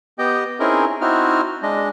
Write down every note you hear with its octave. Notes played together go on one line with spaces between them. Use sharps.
B3 G4 D#5 G5
C4 C#4 D#4 E4 G#4 A#4
C4 D#4 E4 F#4 F6
G#3 D4 D#5